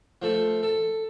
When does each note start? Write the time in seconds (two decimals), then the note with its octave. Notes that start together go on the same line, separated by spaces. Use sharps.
0.22 F3 A3 A4
0.63 A4